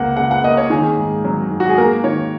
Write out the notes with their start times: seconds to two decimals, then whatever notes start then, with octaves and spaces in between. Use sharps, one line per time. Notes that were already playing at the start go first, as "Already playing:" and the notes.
Already playing: C#2 A#3 F#5
0.16 C#3 F#5
0.31 F#5
0.44 A#3 D#5
0.57 C#5
0.70 D#3 G#4
0.98 G#2
1.25 F#3
1.50 G#2
1.60 F#4
1.69 G#4
1.78 A#3 A#4
2.04 D#3 C#5